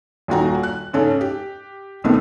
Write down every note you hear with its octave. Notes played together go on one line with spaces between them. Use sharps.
D#1 D#2 F#4 A#5
F#6
G#2 C#3 C#4 A4
G4
C#2 B2 D#3 A3 B3 C4